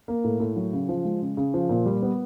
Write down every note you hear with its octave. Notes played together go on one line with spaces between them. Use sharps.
A#3
A2
A2
F#3
C#3
F3
G#3
C#3
C#3
F3
A#2
G3
B3